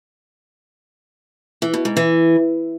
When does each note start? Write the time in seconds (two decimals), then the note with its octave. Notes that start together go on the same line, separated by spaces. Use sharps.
1.62 E3
1.74 B2
1.85 G#2
1.97 E3